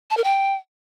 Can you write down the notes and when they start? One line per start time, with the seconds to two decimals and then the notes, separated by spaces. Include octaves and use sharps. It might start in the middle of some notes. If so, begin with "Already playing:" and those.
0.11 A5
0.17 A#4
0.24 G5